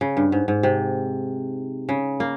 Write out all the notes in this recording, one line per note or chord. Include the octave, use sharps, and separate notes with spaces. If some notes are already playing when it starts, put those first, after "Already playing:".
C#3
G2
G#2
G#2
C3
C#3
A#3